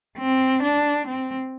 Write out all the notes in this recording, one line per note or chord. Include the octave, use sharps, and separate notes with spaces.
C4
D4
C4